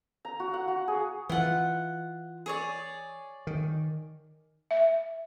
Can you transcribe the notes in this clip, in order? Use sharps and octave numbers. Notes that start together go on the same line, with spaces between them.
A#5
F#4
F#5
F#4
G#4
E3 F4 F#5
G#4 C#5 D5
D#3
E5